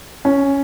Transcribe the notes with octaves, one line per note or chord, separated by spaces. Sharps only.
C#4